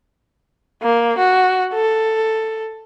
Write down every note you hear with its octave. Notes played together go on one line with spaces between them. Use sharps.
A#3
F#4
A4